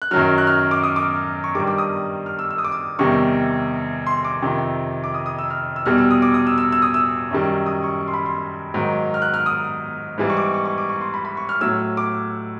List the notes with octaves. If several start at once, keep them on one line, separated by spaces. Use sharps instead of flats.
F#6
F#2 D#3 F#3 F6
F#6
F6
D6
D#6
D6
C#6
G2 D#3 G3 D6
D6
D#6
F6
E6
E6
D#6
D6
D#6
E2 C3 D#3 G3 C#6
C6
D6
F2 C3 D#3
D6
D#6
D#6
E6
F6
E6
E2 B2 G3 F6
E6
D#6
D6
D#6
E6
E6
E6
D#6
E6
F#2 D#3 G3
D#6
C#6
C6
B5
C6
G#2 D#3 F#3
F6
F#6
F6
D#6
G#2 E3 G3
C#6
D6
C#6
C#6
C#6
D6
C#6
C6
B5
B5
C#6
F6
A2 F#3 E6
D6